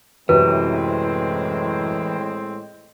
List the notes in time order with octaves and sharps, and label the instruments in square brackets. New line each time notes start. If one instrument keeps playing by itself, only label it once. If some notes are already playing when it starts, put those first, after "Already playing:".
[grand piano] F#2 C3 F#3 [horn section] A2 G#3 C4 [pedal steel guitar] E3 [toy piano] B4